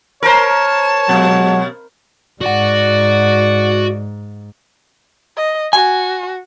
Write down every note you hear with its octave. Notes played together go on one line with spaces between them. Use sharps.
A#4 C5 C#5 A5
B2 F#3 G#3 F#5
G#2 F#4 D5 F#5
D#5
F#4 G#5